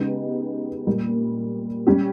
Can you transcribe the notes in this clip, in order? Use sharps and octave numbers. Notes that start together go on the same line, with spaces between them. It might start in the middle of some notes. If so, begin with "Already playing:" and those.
Already playing: C#3 G#3 B3 D#4 G4
A#2 G3 A#3
G3 C#4 G4